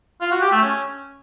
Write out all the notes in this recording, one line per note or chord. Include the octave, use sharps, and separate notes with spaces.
F4
F#4
G4
A3
C#4